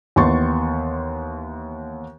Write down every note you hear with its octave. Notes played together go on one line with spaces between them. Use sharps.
D#2 E3 B3 C6 C#6 A6